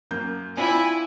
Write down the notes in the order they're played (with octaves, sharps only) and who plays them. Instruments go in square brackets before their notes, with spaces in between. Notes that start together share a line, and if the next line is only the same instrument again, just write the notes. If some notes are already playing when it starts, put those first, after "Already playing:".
[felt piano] F#2 A#3 G6
[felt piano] C4 D4 F4 [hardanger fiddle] E4 [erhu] G#5